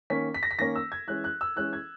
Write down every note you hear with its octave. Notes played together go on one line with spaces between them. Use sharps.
D#3 A#3 C#4 B6
B6
A#6
B6
D#3 A#3 C#4 A#6
E6
G#6
E3 G#3 C#4 F#6
F#6
E6
E3 G#3 C#4 F#6
G#6